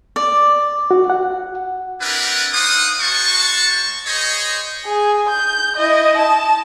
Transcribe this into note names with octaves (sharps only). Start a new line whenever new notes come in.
D5
F#4
F#5
C4 D4 E4 A#4 B4
D#4 C5 F5 F#5 D#6
G#3 F#4 C5 A5 C#6
G#4 C5 C#5 D#5
G#4
G6
E4 D#5
A5